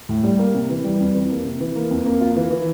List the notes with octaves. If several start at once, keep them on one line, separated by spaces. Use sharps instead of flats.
A2
G3
A#3
C3
E3
G3
F2
E3
A#3
C3
E3
A#3
F2
A#3
F4
E3
E3